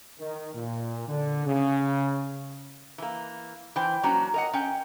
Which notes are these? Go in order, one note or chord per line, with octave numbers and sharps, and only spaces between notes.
D#3
A#2
D3
C#3
E3 A#3
E3 C5 G5
F#3 A#3 C#4 D4 F#4
A#4 D#5 F#5
C#4 F#5 G5